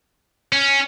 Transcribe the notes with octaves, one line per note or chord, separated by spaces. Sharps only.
C#4